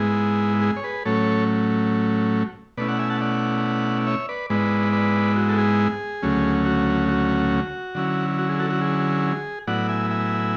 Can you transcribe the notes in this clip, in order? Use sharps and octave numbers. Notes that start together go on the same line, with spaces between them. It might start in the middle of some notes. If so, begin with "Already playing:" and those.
Already playing: G#2 G#3 B3 E4 G#4
G#4
C#5
G#4 B4
A2 F#3 A3 C#4 A4 C#5
B2 A3 C#4 E4 B4 D5
D5 F#5
E5 G#5
F#5 A5
D5 F#5
C#5 E5
B4 D5
G#2 G#3 B3 E4 B4 D5
B4 D5
F#4
A4
G#4
D2 C#3 F#3 A3 C#4
F#4
F#4
D3 F#3 C#4 E4
F#4
G#4
F#4 A4
F#4
G#4
A2 F#3 B3 E4 D5 F#5
E5 G#5
E5 G#5